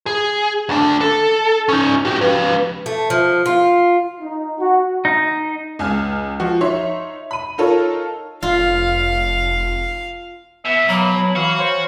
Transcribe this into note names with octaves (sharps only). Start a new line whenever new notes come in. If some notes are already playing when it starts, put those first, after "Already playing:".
G#4
D2 D4
A4
C#4 D#4
F#4 G4
F3 B4
A3
F3
F4
D#4
F#4
D#4
C#2 G#5 F6
F3 F#4
D#4 C#5 E5 C6
B5 D#7
D#4 F4 A4 A#4 C#5
F1 F4 F5
B2 E5
F#3 A#3 B5
F#3 E4
E3 F#4 F5
C5 C#5